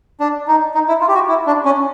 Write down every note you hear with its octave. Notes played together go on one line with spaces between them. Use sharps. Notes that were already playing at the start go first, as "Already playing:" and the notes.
D4
D#4
D#4
E4
F4
G4
F#4
E4
D4
C#4